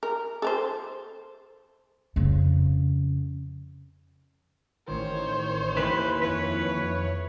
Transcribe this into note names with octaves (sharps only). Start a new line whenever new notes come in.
A#4
A4 A#4 C5
F2 C#3
A1 D#3 C5 C#5
D#2 G#2 E3 B4
F2 E4 B4 C#5